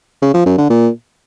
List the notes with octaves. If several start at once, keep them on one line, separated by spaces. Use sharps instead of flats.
C#3
F3
F#2
D3
A#2